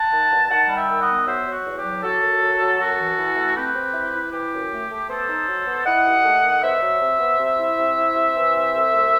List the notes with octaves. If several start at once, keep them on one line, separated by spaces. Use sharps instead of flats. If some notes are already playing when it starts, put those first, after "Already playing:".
Already playing: F#5 A5
D#3
G2
D#3 F#5 A5
G3
E5 G5
D#3
D#5 F#5
B3
F#3 C5 E5
F#3
F#4
E2
G4
F#3
F#3 F#4 A4
F#2
F#3
F#3
F#2 F#4 A4
E3
E3
A3
C4 G4 B4
C4
E4
E4
E3 G4
F#2
A3
A3
B3 A4 C5
D#4
F#3
B3
E4 D#5 F#5
D#2
A3
D#3
B3 C5 E5
F#3
C3
B3
C3
E4
C3
E4
C3
E3
C3
C2
A3